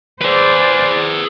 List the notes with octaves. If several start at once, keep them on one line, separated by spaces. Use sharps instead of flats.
G#4 B4 C5 D5